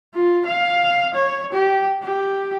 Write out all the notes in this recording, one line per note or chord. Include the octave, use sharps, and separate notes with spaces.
F4
F5
C#5
G4
G4